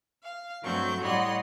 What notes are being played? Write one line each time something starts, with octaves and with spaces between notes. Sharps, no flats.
F5
G2 F#3 A3 C4 C#6 G6
A2 G3 C#5 D#5 F#5 C6